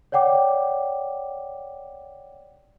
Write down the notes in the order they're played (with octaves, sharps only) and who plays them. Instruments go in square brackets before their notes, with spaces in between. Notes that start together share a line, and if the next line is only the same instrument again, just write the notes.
[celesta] C#5 D5 F#5 G5 D6